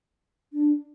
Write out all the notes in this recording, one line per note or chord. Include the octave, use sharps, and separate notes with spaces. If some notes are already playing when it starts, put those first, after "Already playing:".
D4